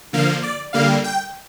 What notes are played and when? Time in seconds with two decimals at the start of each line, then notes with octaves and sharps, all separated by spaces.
0.13 D3 F3 A#3 F5
0.43 D5
0.73 D3 G3 A#3 F5
1.04 G5